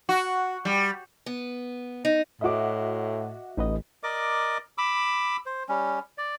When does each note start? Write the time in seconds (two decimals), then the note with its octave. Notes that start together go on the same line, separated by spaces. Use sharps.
0.09 F#4
0.65 G3
1.26 B3
2.05 D#4
2.41 A2 F#4 D#5 E5 D6
3.57 A1 D#4 B4 D#5
4.03 A#4 D5 D#5 D6
4.78 B5 D6 E6
5.46 C5
5.69 G3 C#4
6.18 D5